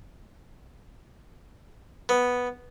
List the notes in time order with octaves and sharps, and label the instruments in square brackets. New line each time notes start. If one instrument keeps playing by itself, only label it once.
[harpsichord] B3